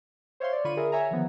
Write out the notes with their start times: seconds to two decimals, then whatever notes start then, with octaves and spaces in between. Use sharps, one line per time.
0.40 C5 C#5 E5 F5 C6
0.53 D5
0.64 D3 F4 B5 C#6 D#7
0.77 G#4 A#4 E5
0.92 C#5 E5 G#5 A#5
1.11 D3 D#3 F3 B3